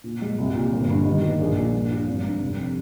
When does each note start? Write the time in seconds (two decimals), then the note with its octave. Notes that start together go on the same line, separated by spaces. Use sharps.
0.04 A#2
0.22 G#3
0.38 C2
0.55 A#2
0.72 G1
0.89 G2
1.05 D#3
1.22 A#3
1.40 A#1
1.56 A#2
1.73 G2
1.90 F3
2.07 G#1
2.24 G2
2.41 F1